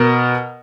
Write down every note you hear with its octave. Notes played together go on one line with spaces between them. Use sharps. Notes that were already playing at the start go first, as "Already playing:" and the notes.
Already playing: B2 A#4